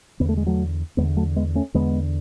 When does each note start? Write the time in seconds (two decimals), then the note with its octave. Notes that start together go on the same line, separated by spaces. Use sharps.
0.20 E2 D3 B3
0.29 A3
0.37 G#3
0.47 F#3 A3
0.97 E2 D3 G#3 B3
1.17 F#3 A3
1.36 G#3 B3
1.55 A3 C#4
1.74 E2 D3 G#3 B3